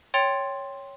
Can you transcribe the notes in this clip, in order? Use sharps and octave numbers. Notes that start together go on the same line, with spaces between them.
C#5 G5 C6 A6 C#7 F7